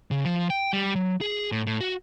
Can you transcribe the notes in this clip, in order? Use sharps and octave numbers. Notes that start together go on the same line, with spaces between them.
C#3
F3
G5
G3
F#3
G#4
A2
A2
F#4